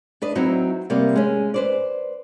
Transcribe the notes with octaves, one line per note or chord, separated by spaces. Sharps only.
D4 B4 D#5
F#3 C4 D#4 E4 F#4
C3 G3 A#3 B3
G#3 C#4
B4 C5 D5